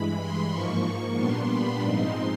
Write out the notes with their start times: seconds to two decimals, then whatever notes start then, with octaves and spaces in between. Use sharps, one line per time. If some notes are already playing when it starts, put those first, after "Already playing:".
Already playing: G2 E3 G#3 B5
0.18 C6
0.51 G#2 F3 A#3 C#6
1.16 A#2 G3 B3 D4 C6
1.49 B5
1.82 G#2 F3 G#3 C4 D#4 C6